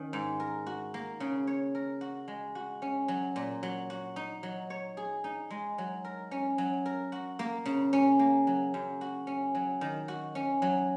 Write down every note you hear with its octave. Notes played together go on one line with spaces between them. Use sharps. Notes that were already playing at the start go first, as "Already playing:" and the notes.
Already playing: D#3 C#4
G#2
A#4
F#4
A#3
C#3
C#5
A#4
F#4
G#3
F#4
C#4
F#3
A#2
F#3
F#4
D#4
F#3
C#5
G#4
D#4
G#3
F#3
A#4
C#4
F#3
A#4
F#4
A#3
C#3
C#4
A#3
F#3
F#2
F#4
C#4
F#3
D#3
F#4
C#4
F#3